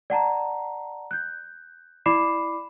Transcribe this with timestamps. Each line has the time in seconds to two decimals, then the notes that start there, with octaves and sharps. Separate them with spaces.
0.10 D5 F#5 A5 A#5
1.11 F#6 G6
2.06 E4 D5 B5 D6 C7 E7